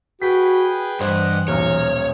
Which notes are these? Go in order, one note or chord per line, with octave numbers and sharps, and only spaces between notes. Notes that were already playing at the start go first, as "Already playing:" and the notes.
F#4 G#4 B4 G5 B6
G2 E3 C5 D#5 F#5
D#1 B1 A#4 C#5